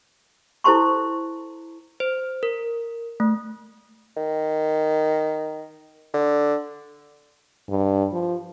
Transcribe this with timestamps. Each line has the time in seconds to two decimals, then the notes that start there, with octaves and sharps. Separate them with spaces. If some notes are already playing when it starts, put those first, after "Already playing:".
0.64 E4 A4 C5 A5 C6 C#6
2.00 C5
2.43 A#4
3.20 A3
4.16 D#3
6.14 D3
7.69 G2
8.12 F3